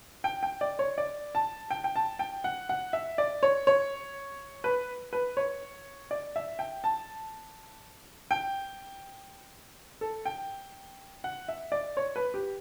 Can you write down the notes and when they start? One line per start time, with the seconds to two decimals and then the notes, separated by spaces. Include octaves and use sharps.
0.24 G5
0.43 G5
0.61 D5
0.79 C#5
0.98 D5
1.35 A5
1.70 G5
1.84 G5
1.96 A5
2.19 G5
2.44 F#5
2.69 F#5
2.93 E5
3.18 D5
3.43 C#5
3.67 C#5
4.64 B4
5.13 B4
5.37 C#5
6.11 D5
6.36 E5
6.59 G5
6.84 A5
8.31 G5
10.01 A4
10.25 G5
11.24 F#5
11.48 E5
11.72 D5
11.97 C#5
12.16 B4
12.34 G4